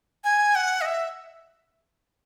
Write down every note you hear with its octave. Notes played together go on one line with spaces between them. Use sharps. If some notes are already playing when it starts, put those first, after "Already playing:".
G#5
F#5
D#5
E5